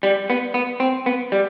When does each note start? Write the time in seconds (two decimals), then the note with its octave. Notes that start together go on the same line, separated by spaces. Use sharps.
0.03 G3
0.30 B3
0.54 B3
0.80 C4
1.06 B3
1.32 G3